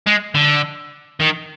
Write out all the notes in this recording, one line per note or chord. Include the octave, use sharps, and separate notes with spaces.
G#3
D3
D#3